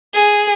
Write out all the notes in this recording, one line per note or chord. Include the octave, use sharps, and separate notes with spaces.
G#4